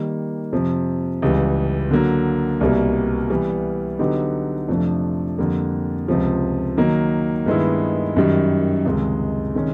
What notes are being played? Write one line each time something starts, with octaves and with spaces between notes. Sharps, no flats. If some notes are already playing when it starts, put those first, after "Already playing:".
Already playing: D#3 G3 A#3
F2 C3 F3
C#2 C#3 E3 G3
D3 F#3 A#3
C2 B2 G3 A#3
E3 G3 B3
D3 F#3 B3 D#4 G4
F2 C3 F3 A3 D4
F2 D3 G3 A#3
C#2 C3 F3
D#3 F#3 A#3
G2 D#3 G#3 B3 E4
F#2 D#3 G3
C#2 C3 D#3 G#3
C3 D#3 G#3 C#4